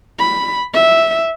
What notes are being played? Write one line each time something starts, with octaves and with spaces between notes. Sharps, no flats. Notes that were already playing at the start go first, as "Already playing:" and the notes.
B5
E5